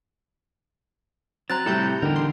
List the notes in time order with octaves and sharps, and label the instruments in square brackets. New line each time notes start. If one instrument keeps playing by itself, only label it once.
[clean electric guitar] F#3 [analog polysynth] C4 [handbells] A#5 F#6 A6
[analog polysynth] A2 G3 G6 [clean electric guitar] C3 A3 A4 [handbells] E4
[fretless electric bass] E2 D3 D#3 [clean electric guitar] G4 A#4
[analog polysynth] C6